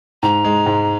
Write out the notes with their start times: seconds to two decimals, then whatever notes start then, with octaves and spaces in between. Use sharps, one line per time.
0.22 G#2 A#5
0.45 G#3
0.66 G#2